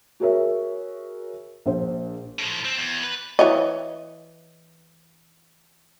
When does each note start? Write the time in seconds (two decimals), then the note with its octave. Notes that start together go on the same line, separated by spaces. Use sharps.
0.20 F#4 G#4 A#4 C#5 E5
1.66 A#1 C5
2.39 A2 F3
2.65 C4
2.77 E2
3.03 B4
3.39 E3 C#5 D#5